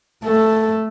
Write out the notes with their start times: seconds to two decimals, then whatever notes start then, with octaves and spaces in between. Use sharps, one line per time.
0.24 A3 A4